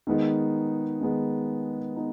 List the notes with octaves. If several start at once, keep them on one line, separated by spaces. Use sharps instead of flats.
D#3 G#3 B3 D#4
D#3 G#3 B3 D#4
B3 D#4